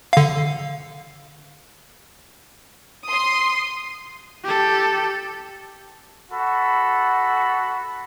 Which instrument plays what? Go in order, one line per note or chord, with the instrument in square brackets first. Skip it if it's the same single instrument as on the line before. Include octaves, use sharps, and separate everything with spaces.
[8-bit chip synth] D3 F5
[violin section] C6 D#6
[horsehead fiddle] G4 A4
[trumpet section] F#4 A4 B5